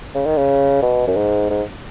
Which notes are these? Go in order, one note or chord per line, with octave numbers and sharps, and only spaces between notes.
C#3
D#3
C#3
B2
F#2
G#2
G#2